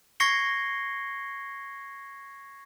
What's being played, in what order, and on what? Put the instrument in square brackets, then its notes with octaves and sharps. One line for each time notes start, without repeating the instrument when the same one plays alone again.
[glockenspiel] C#6 G#6 A#6 C7 C#7 G7